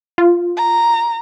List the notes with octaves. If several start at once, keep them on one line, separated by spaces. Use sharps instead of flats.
F4
A#5